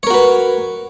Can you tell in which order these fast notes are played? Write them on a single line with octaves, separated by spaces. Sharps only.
C#5 A#4 F#4 B4